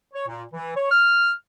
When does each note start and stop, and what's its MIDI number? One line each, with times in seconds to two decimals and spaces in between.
0.14 0.25 73
0.28 0.43 46
0.52 0.75 52
0.76 0.88 73
0.90 1.32 89